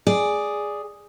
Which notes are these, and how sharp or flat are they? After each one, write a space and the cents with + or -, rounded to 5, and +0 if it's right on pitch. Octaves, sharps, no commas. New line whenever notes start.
G#4 +0 D5 +0